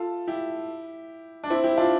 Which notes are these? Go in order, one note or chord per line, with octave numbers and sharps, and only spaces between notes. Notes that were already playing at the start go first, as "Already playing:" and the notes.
Already playing: F4 A4
E4 G4
D4
C4 E4
E4 G4
D4 F4